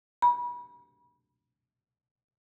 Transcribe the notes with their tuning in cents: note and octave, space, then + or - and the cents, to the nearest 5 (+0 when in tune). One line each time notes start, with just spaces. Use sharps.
B5 -30